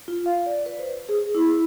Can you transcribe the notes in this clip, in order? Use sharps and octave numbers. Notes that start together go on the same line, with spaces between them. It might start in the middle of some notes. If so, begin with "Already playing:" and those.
F4
F5
D5
B4
C5
G#4
E4